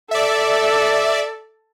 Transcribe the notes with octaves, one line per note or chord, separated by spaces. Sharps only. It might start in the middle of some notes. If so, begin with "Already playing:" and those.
A4 D5 E5